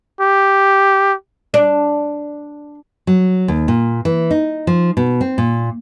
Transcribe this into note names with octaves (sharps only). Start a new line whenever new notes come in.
G4
D4
F#3
D#2
A#2
E3
D#4
F3
B2
C4
A#2